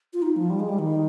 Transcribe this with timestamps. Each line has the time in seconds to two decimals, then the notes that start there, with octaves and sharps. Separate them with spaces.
0.13 F4
0.22 D#4
0.36 F3
0.50 G3
0.60 G#3
0.69 G3
0.79 D#3